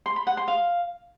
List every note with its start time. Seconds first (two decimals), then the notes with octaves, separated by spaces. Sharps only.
0.06 C6
0.16 B5
0.27 F#5
0.37 C6
0.48 F5